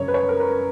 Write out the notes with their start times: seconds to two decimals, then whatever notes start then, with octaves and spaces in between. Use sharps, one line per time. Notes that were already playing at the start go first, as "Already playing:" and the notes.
Already playing: F#2 C#3 C#5
0.08 B4
0.14 C#5
0.29 A#4
0.40 B4